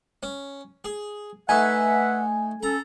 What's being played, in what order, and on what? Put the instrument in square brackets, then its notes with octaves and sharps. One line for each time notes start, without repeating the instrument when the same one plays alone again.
[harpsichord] C#4
G#4
[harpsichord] A3 D#4 [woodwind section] B4 E5 F#5 [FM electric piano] G#5
[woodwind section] C#4 A4 [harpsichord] A#5